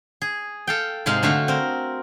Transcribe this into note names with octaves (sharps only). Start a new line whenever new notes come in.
G#4
A4 F5 G5
G#2 C3 G#3 F5 C6
D3 A3 F#4 F5
C4 A#4